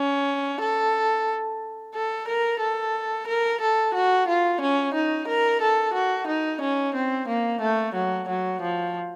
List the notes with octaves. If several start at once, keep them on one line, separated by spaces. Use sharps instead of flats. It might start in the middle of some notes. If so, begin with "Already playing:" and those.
Already playing: C#4
A4
A4
A#4
A4
A#4
A4
F#4
F4
C#4
D#4
A#4
A4
F#4
D#4
C#4
C4
A#3
A3
F#3
F#3
F3